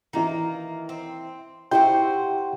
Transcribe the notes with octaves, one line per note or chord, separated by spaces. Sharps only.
D#3 E3 A#3 E4
C4
C3 E4 F#4 G4 C5 G5 C6